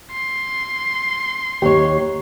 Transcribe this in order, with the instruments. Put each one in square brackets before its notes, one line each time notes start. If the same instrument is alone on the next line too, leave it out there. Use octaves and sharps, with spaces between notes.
[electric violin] C6
[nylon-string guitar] D#2 C#5 [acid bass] G4